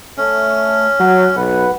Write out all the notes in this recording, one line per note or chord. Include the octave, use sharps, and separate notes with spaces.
A3 C#4
F#3 F#5
B1 B4 F#5